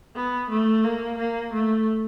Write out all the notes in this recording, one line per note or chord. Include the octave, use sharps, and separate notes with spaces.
B3
A3
A#3
A#3
A3